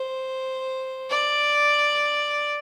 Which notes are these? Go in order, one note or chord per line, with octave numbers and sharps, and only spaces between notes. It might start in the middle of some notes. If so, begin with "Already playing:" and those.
Already playing: C5
D5